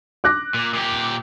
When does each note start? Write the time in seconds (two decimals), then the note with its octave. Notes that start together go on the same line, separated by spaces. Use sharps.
0.24 D6 F#6 A#6
0.54 A#2
0.74 A#2 G4